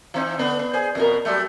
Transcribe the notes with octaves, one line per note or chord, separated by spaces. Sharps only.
E3 C4 D#4
D3 B3 D4
B3
G#4 C5
F2 B2 A#4
F#3 G3 A3